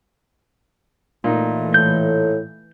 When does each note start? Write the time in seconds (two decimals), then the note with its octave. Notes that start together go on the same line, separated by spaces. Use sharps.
1.24 A#2 E3 A3 D#4
1.74 A2 G6